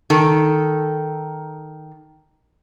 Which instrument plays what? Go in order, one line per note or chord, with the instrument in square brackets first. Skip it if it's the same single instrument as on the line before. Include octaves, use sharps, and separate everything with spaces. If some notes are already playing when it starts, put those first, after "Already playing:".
[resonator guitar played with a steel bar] D#3 A4